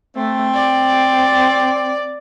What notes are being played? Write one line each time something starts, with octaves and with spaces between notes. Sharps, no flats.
A3 C4
D5